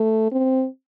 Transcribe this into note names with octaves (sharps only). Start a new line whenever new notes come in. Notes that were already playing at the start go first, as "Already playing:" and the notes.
Already playing: A3
C4